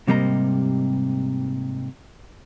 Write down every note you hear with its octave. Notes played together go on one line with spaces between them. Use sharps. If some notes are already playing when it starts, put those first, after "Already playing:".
G#2 C3 G3 A#3 D#5 A#5